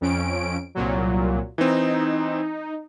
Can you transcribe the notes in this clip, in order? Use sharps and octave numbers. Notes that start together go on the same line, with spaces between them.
F2 C#4 D7
C2 A#2 F#3
E3 C4 D#4